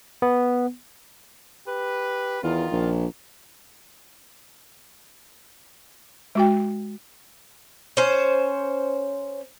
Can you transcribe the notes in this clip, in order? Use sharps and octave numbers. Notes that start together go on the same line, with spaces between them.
B3
G4 B4
E2 D#3 F4
A#1
G#3 F#4 G5
C#4 C5